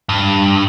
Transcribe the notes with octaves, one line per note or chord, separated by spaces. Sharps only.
G2